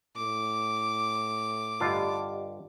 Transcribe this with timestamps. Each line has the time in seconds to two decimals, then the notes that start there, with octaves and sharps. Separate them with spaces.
0.16 A2 D6
1.80 G2 D3 F4 G4 D5 D#5